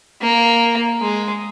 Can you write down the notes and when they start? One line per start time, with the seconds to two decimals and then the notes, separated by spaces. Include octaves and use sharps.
0.21 A#3
1.01 G#3